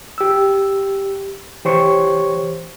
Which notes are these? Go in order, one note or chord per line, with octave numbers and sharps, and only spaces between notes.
G4 E6
E3 G4 C5 C#5 C#6